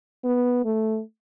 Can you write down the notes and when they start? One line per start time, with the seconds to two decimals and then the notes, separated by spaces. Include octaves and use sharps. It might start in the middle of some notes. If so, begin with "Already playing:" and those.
0.24 B3
0.65 A3